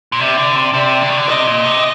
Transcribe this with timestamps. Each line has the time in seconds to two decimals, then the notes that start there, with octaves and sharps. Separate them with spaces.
0.12 A#2
0.20 C3 D5
0.38 D3
0.55 C3
0.74 C3
1.01 D3
1.09 D#3
1.17 D3
1.28 C3 D#5
1.47 A#2
1.65 C3